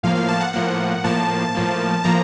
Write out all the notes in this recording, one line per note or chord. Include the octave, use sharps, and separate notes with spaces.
A2 F3 A#3 F5
F5
A5
F#5
A2 F3 A#3 F#5
A2 F3 A#3 A5
A2 F3 A#3
A2 F3 A#3 A#5